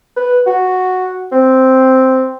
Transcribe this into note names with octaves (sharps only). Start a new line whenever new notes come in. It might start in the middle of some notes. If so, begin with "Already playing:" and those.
B4
F#4
C4